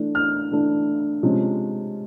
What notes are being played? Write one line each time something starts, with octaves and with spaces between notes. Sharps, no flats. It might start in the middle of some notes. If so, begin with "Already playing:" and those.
Already playing: E3 A3 D4
F6
E3 A3 D4
C3 F3 G#3 C#4